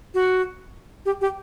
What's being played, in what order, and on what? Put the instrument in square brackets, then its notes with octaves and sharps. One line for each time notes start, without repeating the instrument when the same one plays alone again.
[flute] F#4
G4
G4